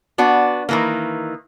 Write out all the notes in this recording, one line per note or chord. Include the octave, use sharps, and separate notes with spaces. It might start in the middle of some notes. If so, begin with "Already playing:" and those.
B3 D4 F#4
D#3 E3 A#3